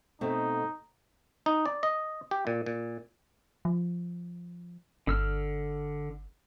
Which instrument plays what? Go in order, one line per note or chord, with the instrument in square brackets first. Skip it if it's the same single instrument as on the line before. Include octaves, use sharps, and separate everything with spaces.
[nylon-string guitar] B2 A3 C4 [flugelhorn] D#4
[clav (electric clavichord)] D#4
D5
D#5
G4
A#2
A#2
[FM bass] F3
[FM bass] G1 [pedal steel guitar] D3 E6 F6